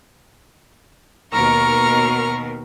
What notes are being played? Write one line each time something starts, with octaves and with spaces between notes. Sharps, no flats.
D#2 B2 A#4 A#5 C#6 F6